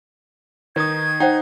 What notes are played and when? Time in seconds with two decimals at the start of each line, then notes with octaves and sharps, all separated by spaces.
0.76 D#3 D#4 B4 D#6 G#6
1.20 D#4 C5 F#5 G5